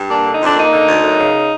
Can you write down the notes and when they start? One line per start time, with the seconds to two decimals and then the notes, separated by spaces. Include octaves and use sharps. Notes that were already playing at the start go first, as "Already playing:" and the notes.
Already playing: G2
0.09 A#3 D4
0.25 D3
0.33 D#4
0.40 F2 D4
0.56 A#3 D#4
0.72 D3
0.87 D2
1.03 F#2
1.18 C#3